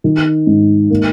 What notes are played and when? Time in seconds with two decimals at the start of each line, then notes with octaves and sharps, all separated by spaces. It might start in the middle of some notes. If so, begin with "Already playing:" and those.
0.04 D#3
0.47 G#2
0.90 A#3